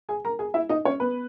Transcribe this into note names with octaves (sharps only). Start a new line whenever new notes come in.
G#4 G#5
A#4 A#5
G#4 G#5
E4 E5
D#4 D#5
C#4 C#5
B3 B4